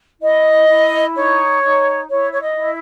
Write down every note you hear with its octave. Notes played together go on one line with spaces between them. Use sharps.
E4 D#5
E4
D#4 C#5
D#4
E4 C#5
C#5
D#5
E4